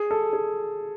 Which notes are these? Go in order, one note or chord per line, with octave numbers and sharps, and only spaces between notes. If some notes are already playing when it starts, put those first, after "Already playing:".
Already playing: G#4
A4
G#4